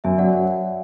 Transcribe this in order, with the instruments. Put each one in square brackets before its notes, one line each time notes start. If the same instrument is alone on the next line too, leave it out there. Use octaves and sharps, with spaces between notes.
[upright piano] F#2 [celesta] E5 G#5
[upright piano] F#3 [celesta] D5 F#5